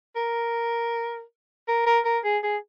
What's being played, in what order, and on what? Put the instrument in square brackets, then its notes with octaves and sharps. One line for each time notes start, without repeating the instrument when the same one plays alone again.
[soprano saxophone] A#4
A#4
A#4
A#4
G#4
G#4